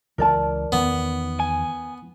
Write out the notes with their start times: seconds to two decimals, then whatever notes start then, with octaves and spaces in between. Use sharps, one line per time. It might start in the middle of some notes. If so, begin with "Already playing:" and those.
0.18 C#2 E3 C#4 A#4 D5 A5
0.72 E2 D#3 B3 C#4
1.40 G#5